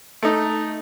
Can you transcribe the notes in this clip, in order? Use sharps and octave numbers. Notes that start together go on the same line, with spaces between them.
A3 D#4